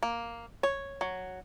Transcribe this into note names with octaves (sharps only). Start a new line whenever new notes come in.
A#3
C#5
F#3